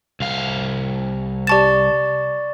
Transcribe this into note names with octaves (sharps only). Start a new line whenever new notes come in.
C2 F5
G4 D5 A5 C#6 A6 E7